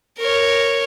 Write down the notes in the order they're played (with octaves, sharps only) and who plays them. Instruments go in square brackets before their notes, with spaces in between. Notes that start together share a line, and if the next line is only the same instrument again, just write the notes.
[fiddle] A#4 C#5